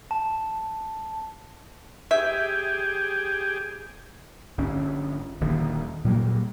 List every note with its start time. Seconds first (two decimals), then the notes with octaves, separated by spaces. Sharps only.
0.11 A5
2.11 G4 G#4 E5
4.58 G1 C#4
5.40 D#1 D#2 D3 D#3
6.04 A#2 F#3 G3 A#3